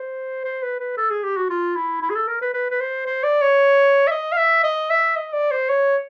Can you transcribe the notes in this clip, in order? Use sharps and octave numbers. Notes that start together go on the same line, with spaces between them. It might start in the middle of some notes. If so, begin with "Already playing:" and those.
Already playing: C5
C5
B4
B4
A4
G#4
G4
F#4
F4
E4
E4
G#4
A4
A#4
B4
B4
B4
C5
C5
D5
C#5
E5
D#5
F5
E5
D#5
E5
D#5
D5
C5
C#5